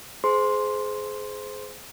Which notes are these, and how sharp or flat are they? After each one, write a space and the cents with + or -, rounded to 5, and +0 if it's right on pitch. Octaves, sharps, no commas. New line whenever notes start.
G#4 +25 C5 -15 C6 +5